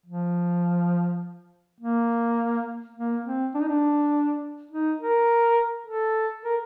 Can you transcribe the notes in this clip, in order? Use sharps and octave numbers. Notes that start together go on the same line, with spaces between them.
F3
A#3
A#3
C4
D4
D#4
D4
D#4
A#4
A4
A#4